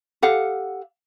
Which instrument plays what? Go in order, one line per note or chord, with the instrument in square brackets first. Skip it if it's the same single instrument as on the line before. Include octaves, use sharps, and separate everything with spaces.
[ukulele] G4 A4 F5 F#5